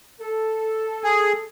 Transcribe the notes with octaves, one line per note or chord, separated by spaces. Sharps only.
A4
G#4